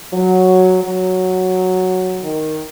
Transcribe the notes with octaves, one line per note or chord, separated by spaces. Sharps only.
F#3
F#3
D#3